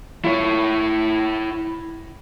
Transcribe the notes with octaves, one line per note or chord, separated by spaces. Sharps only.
E4 C#5